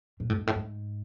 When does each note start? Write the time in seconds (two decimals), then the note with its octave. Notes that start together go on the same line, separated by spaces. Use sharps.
0.20 A#2
0.30 A2
0.38 G#2
0.47 A2
0.55 G#2